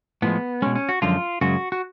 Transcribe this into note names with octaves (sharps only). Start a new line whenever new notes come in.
A2 F3 G#3 B3
B2 G#3 C#4
C#4
F#4
F#2 D3 F3 G#3 F4
F#2 C#3 G#3 F#4
F#4